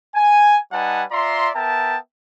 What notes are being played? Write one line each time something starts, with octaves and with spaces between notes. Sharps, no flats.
G#5
G3 D#4 B4 F#5 G#5 A5
F4 D5 E5 A#5 C6
B3 A#4 E5 G5 A5